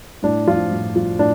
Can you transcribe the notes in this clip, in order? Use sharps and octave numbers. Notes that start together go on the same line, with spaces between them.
A2 D4
F3 F4
A2
F3
A2 D4